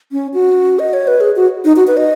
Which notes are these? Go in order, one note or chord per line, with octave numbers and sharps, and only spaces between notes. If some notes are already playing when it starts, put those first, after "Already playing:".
C#4
F#4
D#5
C#5
B4
G#4
F#4
D#4
F#4
B4
D#5